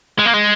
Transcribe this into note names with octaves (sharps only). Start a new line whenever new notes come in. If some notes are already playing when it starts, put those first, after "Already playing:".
G#3
A#3
G#3